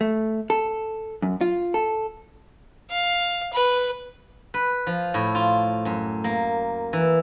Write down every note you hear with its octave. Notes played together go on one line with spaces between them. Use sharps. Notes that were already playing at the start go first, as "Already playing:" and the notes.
A3
A4
F#2
F4
A4
F5
B4
B4
F3
A2
F4
F#2
A#3
E3